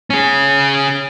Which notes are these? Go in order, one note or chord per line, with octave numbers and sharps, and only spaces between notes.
C#4 G#4